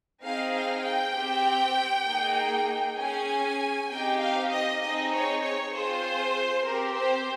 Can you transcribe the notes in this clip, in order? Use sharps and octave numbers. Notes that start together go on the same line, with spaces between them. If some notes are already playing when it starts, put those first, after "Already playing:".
C4 D#4 G#4 F5
F5
G5
C4 G4
A#3 D#4 G#4
C#4 G#4 G#5
C4 D#4 G4 G5
F5
D#5
C4 D#4 G#4 D#5
C#5
C#5
C4 F4 G#4 C5
C4 G4 A#4
C5